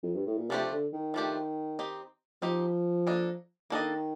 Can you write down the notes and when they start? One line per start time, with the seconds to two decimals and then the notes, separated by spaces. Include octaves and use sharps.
0.03 F2
0.16 G2
0.27 A2
0.38 A#2
0.50 C3 F3 A3 D4 G4 C5
0.72 D3
0.93 D#3
1.14 F3 A3 D4 G4 C5
1.79 C4 D#4 G4
2.42 F3 C4 D#4 G4
3.07 A#3 D4 A4 D#5
3.70 D#3 A#3 D4 A4 D#5